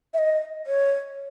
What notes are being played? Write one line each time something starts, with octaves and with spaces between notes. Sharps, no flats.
E5
D#5
C#5